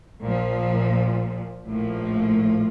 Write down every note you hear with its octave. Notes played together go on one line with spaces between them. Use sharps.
A#1 A#2 F3
A#1 A2 F3 A#3